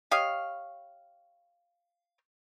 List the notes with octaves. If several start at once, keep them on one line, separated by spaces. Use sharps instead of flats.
G4 C#5 D#5 F5